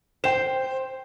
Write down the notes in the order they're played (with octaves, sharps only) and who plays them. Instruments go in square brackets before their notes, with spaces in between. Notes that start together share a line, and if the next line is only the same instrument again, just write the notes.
[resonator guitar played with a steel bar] C5 [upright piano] G5 E7